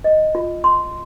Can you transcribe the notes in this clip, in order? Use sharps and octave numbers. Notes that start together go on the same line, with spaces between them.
D#5
F4
C6